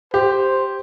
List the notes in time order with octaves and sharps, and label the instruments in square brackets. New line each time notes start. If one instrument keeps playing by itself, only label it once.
[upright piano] G4 [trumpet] C5